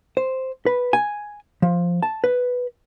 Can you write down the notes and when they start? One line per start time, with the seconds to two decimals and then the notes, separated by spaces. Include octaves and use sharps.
0.17 C5
0.66 B4
0.93 G#5
1.62 F3
2.02 A5
2.24 B4